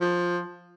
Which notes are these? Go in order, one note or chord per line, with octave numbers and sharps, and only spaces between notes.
F3